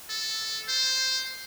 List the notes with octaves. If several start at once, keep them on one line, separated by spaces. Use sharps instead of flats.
A4
C5